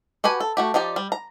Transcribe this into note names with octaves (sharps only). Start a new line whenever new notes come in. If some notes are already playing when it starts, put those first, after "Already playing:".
F#4 G4 B4 G#5
A4
A3 F#4 G4
F3 D#4 G4 D5
G3
A#5